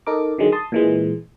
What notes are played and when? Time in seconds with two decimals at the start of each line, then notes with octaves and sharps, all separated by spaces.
0.07 D#4 A4 A#4 D6
0.38 D3 D#3 F#3 G#3
0.52 A5 C6 D#6
0.72 A#2 E3 G#3